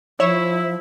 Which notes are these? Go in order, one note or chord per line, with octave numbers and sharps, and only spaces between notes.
F3 E4 C#5 E7